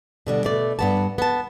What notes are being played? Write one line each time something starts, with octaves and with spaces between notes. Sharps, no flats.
B2 D3 G3
B2 A3 D5
G2 B3 A5
B3 A5